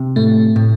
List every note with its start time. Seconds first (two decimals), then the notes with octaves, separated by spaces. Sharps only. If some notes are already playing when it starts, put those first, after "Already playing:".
Already playing: C3
0.16 A2 A3
0.56 A2